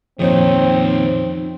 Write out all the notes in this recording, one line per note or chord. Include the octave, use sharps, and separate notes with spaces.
F2 A#2 D#3 F3 C4 D#4 C#5 D#5